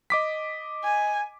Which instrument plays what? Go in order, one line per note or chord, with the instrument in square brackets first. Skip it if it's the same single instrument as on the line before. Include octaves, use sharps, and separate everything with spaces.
[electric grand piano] D#5 D6 B6
[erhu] G#5